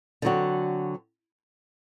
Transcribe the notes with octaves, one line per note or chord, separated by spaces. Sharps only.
D3 F#3 C4 F#4